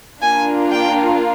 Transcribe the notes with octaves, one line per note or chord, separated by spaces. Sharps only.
A#3 D4 F4 G#5
G5